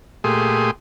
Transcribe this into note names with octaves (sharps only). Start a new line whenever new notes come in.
A#2 A3 G4 G#4 C6 D#6